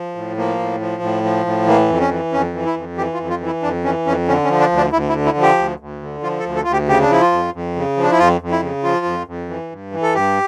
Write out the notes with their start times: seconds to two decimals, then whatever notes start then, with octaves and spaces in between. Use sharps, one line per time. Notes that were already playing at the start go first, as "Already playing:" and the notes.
Already playing: F3
0.15 A2
0.37 F3 A#3
0.59 A2
0.80 F3
1.02 A2
1.24 F3
1.46 A2
1.67 E3 A#3
1.89 F2
2.00 C#4
2.11 E3
2.32 F2 C#4
2.54 E3
2.65 E4
2.76 F2
2.97 E3 G4
3.14 F4
3.19 F2
3.30 F4
3.41 E3
3.46 E4
3.63 F2 D4
3.84 E3 C#4
4.06 F2 C#4
4.28 D3 C#4
4.44 C#4
4.49 F3
4.60 D4
4.72 D2
4.77 D4
4.93 D2 E4
5.09 E4
5.14 D3
5.26 E4
5.37 F3
5.42 G4
5.58 D2
5.79 D2
6.02 D3
6.23 F3 F4
6.39 A4
6.45 D2
6.56 A4
6.64 D2 F4
6.73 G4
6.88 C#3 G4
7.02 D4
7.10 F3 E4
7.21 F4
7.32 F2
7.54 F2
7.76 C#3
7.97 F3
8.03 D4
8.11 E4
8.19 F2 F4
8.41 F2
8.51 E4
8.62 C#3
8.84 F3 F4
9.05 F2
9.27 F2
9.49 E3
9.71 G2
9.92 E3
10.02 A4
10.14 G2 G4